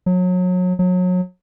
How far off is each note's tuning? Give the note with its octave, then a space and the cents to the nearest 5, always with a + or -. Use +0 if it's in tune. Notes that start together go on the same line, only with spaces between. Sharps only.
F#3 -30
F#3 -30